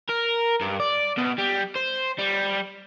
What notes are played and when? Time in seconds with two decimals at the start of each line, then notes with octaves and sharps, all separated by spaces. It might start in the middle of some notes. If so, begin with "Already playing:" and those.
0.09 A#4
0.61 G2
0.80 D5
1.17 B2
1.38 G3
1.76 C5
2.18 G3